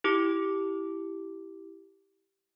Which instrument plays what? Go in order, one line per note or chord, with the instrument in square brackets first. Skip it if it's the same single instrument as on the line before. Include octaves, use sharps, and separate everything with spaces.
[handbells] E4 G4 D6